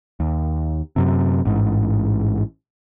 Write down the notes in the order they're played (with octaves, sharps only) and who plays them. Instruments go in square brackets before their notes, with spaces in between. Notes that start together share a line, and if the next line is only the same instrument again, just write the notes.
[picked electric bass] D#2
F#2 C3
A1 G#2